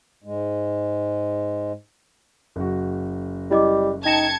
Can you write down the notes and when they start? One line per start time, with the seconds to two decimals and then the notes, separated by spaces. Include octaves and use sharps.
0.24 G#2 G#3
2.56 F#1 F#4
3.51 G3 E4 D#5 D6
4.05 D#4 G5 A5 G#6 A#6 C#7 E7